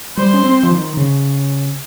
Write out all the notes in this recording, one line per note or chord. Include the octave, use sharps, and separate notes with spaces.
G3 C5
C#4
C4
F3
D#3
C#3